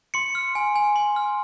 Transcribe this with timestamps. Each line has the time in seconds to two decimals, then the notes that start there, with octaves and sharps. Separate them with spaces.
0.14 C6 C#7
0.35 F6
0.55 G#5
0.76 G#5
0.96 C6
1.16 F6